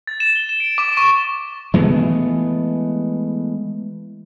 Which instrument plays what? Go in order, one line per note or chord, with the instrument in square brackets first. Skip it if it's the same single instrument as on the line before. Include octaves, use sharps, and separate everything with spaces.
[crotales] A6
E7
G7
E7
D7
D6
C#6
[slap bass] E3 G#3 A3 B3